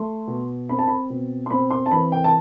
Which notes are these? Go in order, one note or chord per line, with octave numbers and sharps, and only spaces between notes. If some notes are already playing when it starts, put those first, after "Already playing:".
Already playing: A3 C6
B2
C4 B5
A5
B5
B2
C6
C4 B5
C6
A5
E3 B5
G5
A5